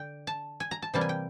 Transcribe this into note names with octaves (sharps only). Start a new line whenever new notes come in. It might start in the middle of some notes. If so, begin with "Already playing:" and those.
Already playing: D3 G5
A5
G#5
A#5
A5
C3 E3 G3 A#3 A5
G#5
G5